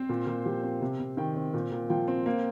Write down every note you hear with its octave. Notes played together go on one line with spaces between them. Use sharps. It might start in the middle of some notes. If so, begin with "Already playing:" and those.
Already playing: C4 C5
A#2
A#2
F3 G4
C4
C3
C3
D#3 G5
C4
A#2
A#2
F3 G5
C4
A#3